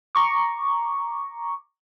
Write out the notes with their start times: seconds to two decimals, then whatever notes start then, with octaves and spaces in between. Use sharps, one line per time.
0.15 A#5 C#6 D6